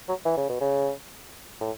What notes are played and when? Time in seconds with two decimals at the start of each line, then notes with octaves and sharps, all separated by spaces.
0.08 F#3
0.25 E3
0.37 C#3
0.49 B2
0.61 C#3
1.61 A2